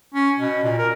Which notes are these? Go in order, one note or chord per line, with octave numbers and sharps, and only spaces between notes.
C#4
B2
A#2
A#4